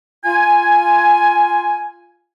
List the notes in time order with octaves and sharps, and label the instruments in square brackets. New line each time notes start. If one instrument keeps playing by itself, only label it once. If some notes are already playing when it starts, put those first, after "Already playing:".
[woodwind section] F4 G#5